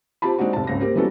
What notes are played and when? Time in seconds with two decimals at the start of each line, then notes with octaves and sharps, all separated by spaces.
0.22 C4 F4 G4 A5 B5
0.38 G#3 C4 D4 D#4 F#4
0.53 F1 A5
0.67 G#1 C#2 A#6
0.81 A#3 C4 G4 A#4
0.96 E3 F#3 G3 B3 C#4 A4